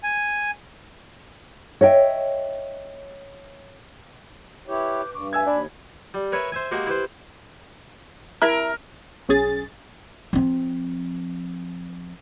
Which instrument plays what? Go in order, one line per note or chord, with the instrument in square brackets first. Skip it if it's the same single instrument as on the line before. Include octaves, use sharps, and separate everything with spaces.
[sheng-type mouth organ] G#5
[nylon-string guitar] C#5 D#5 E5 G5
[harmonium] E4 G4 C#5 [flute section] B4 D6 G6
[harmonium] G2 [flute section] C#6 D6
[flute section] B4 E5 [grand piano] G#5 E6 G#6
[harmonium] D#2 [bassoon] D4 [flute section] B5
[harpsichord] G3
A#4 B4 C#5 E5 G#5 B5
C5 E5 G#5
G#3 A#3 F#4 G4 A#4
E4 G4 B4 C5
[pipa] E4 E5 [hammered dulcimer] A#4
[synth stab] B1 C#4 G#4 A6
[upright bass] F3 C4